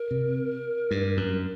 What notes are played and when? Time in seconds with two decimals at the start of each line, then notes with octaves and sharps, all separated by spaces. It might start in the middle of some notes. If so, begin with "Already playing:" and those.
Already playing: A#4
0.11 C3
0.91 G2
1.17 F#2